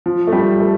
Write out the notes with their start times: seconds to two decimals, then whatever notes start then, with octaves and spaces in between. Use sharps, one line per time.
0.06 F3
0.27 A3
0.33 G3
0.60 A3